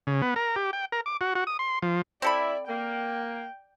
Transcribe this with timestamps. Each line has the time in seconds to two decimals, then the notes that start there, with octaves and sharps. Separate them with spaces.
0.07 C#3
0.22 B3
0.36 A#4
0.56 G4
0.73 G5
0.92 A#4
1.06 D6
1.21 F#4
1.35 F#4
1.47 D#6
1.59 C6
1.82 F3
2.22 C4 E4 A4 D5 B5
2.68 A#3 G5